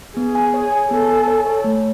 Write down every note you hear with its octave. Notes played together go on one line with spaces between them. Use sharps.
B3 G#4
G#5
C#5
G#5
B3 A4
G#5
C#5
C#5
A3